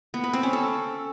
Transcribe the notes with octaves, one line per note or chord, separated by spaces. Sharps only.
B3
B4
C4
C#4
A4